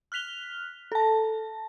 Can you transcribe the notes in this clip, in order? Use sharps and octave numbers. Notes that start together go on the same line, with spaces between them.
F6 F#6 B6 F7 G7
A4 A5